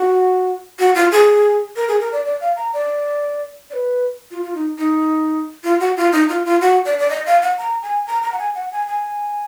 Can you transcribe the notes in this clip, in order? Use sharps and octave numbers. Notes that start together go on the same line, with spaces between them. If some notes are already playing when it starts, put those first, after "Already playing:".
Already playing: F#4
F#4
F4
G#4
A#4
G#4
A#4
D5
D5
F5
A#5
D5
D5
B4
F4
F4
D#4
D#4
F4
F#4
F4
D#4
F4
F4
F#4
D5
D5
D#5
F5
F#5
A#5
G#5
A#5
A#5
F#5
G#5
F#5
G#5
G#5